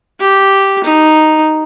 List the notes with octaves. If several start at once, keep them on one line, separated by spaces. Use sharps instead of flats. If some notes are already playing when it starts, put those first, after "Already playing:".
G4
D#4